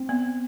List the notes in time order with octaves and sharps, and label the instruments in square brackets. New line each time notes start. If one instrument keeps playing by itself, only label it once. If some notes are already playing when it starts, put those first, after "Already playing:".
Already playing: [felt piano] C4
[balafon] B3